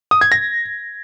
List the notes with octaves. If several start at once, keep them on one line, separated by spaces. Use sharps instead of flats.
D#6
G#6
A#6